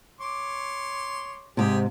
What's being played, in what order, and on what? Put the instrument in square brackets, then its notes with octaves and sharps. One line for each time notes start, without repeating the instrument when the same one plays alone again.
[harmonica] C#5 C6 D6
[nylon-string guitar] G#2 C3 [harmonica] G4 G#4